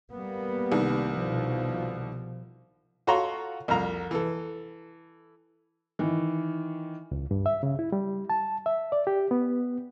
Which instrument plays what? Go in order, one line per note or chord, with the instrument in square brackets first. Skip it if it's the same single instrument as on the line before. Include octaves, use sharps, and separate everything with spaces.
[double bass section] G3 A#3 B3
[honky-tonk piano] C2 D#3
[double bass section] B2 F3
[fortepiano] F4 F#4 A4 C#5 A#5 C6
C2 F2 F5 A#5
E3 A4
[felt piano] D#3 E3
[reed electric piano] C#2
G2
E5
C#3
E4
G3
A5
E5
D5
G4
B3